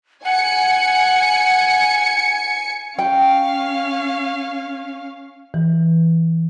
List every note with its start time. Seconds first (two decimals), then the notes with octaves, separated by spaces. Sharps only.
0.25 F#5 G#5 C#7
2.99 C#4 F5 G5
5.54 E3